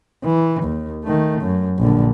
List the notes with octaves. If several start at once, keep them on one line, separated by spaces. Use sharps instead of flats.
E3
D#2
D#3 A3
F#2
A#1 D3